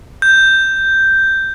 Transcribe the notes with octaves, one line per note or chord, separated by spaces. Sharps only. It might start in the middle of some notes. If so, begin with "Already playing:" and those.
G6